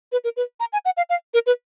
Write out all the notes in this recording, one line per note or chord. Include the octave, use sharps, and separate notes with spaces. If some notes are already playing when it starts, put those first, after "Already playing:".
B4
A#4
B4
A#5
G#5
F#5
F5
F5
A#4
B4